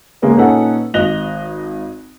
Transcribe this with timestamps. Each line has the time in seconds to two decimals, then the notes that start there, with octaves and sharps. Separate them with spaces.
0.22 C#3 G#3 A#3 B3
0.37 A#2 C#4 D#4 A4 B4 F#5
0.94 G#1 D#5 F#6 A#6 F7 G7